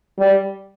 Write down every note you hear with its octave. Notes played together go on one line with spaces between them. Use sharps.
G3